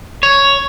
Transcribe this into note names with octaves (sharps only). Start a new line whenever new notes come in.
C#5